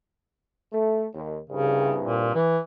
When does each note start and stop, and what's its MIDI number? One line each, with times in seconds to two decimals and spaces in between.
0.72 1.07 57
1.14 1.38 39
1.50 2.33 36
1.50 2.33 43
1.50 1.96 49
2.04 2.33 46
2.35 2.58 52